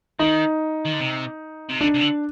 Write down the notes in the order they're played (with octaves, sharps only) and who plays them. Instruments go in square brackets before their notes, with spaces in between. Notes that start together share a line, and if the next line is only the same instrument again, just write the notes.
[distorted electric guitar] D#3 [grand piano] D#4
[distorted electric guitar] D#3
D3
C3
C3
[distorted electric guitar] D3 [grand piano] D4
[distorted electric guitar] C3
D3